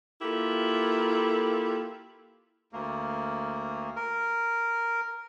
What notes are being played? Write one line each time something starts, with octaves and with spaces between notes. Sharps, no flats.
A#3 E4 F4 G4 A4 A#4
D2 A#3
A#4